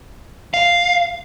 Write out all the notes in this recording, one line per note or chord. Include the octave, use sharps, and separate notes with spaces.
F5